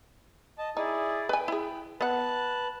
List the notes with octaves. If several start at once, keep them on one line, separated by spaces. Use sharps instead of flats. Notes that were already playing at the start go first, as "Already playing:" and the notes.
D#5 A5
D#4 E4 G#4 D5
B4 G5 G#5 B5
E4 G#4
B3 B4 F#5 A5 F#6